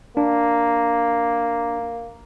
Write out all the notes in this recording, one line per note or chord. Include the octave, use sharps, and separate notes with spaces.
A#3 D4